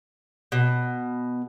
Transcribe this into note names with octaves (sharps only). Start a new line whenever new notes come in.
B2